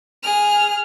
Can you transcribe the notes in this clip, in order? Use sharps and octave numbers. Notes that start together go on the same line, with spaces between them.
G#4 F6